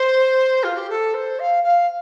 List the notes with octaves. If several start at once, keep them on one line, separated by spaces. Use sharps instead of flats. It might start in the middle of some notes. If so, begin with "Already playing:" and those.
Already playing: C5
F4
G4
A4
C5
F5
F5